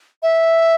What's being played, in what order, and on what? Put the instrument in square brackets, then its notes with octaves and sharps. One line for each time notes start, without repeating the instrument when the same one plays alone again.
[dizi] E5